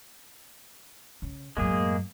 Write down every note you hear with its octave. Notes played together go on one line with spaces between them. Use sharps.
C#3
F#2 A2 G#3 A#3 G#4